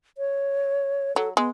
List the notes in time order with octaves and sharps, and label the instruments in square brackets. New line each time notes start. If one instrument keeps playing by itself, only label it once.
[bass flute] C#5
[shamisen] F#3 [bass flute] A4
[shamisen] G#3 [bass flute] B3